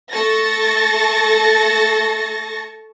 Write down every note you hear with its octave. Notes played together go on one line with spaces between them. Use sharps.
A3 A4 A5 C#6 A6 A#6